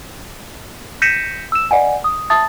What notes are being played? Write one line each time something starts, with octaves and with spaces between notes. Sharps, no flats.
G6 A#6 B6 C#7 D#7 E7
E6 E7
D5 D#5 F#5 G#5
D#6
E5 A5 D#6 A6